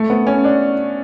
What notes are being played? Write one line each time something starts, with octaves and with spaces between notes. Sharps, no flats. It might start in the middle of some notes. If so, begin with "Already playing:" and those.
Already playing: A3
B3
C#4
D4